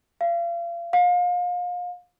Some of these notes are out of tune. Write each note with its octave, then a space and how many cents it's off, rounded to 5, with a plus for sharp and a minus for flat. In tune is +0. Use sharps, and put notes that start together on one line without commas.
F5 -35
F5 +35